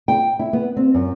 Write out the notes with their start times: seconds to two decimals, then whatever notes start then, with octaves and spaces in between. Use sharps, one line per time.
0.08 G5
0.39 E4
0.53 B3
0.77 C4
0.94 F#2